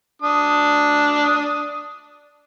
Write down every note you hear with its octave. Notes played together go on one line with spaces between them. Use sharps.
D4 D#6